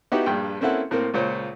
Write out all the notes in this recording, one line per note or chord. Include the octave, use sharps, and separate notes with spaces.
B3 D#4 E4 F#4 G4
A#1 G2 G5
A#3 C4 C#4 E4 A4 F#5
A2 A#3 C4
C#2 A#2 C5 C#5